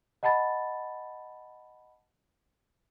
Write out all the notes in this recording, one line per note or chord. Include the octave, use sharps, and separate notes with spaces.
D#5 F#5 A5 B5 A6